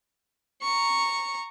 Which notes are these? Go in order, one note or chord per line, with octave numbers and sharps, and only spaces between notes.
A#5 C#6